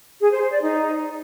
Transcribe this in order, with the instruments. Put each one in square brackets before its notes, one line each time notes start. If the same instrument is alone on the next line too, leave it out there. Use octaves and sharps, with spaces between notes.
[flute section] G#4
C5
C5
D5
D#4